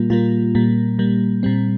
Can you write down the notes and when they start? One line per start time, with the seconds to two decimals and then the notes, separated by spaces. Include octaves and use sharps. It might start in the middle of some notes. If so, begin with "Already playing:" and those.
Already playing: A#2 G3 A#3 F4
0.10 A#2 G3 A#3 F4
0.55 A#2 G3 A#3
0.99 A#2 G3 A#3
1.43 A#2 G3 C4